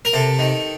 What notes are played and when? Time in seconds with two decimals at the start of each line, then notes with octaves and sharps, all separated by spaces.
0.05 A#4
0.13 C3 A4
0.39 D#3